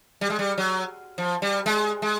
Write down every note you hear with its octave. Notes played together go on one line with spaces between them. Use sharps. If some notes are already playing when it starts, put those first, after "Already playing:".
G3
G#3
G3
F#3
F3
G3
G#3
G#3